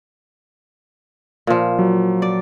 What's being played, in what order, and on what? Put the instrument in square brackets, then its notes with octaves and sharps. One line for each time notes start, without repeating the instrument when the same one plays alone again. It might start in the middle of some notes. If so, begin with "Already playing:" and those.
[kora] A#2 F3
[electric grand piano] F#3
[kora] D5